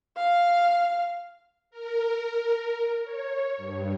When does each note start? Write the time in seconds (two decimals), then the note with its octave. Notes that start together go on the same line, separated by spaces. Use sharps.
0.17 F5
1.71 A#4
3.03 C#5
3.58 G2